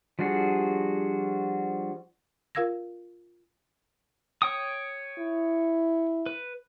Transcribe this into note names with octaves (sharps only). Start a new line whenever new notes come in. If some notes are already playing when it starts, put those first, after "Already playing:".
F3 G3 D4 F#4 G#4
F4 A#4 F5 E6 G#6 A#6
C#5 G5 D#6
E4
B4